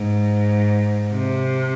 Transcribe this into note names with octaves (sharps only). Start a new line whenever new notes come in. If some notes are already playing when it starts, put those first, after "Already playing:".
Already playing: G#2
C3